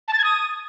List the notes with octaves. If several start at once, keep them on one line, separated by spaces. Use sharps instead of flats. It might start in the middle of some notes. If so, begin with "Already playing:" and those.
A5
A6
G#6
D#6